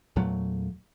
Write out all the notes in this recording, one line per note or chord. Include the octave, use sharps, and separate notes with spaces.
E2 A#2 F#3 A3